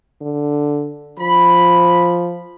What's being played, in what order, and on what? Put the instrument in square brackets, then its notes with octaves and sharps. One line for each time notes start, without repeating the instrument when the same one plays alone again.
[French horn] D3
[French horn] F3 [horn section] B5